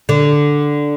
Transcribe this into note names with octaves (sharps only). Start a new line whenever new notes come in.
D3